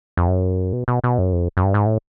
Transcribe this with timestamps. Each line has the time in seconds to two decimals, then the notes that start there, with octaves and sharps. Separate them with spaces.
0.17 F2
0.28 F#2
0.73 B2
0.88 B2
1.04 B2
1.18 F#2
1.33 F2
1.57 F#2
1.64 G2
1.74 G#2
1.86 A2